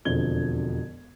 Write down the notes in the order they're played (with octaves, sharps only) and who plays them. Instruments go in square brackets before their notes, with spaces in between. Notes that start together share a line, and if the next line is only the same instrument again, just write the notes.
[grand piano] E1 F2 D3 F3 G#6 G7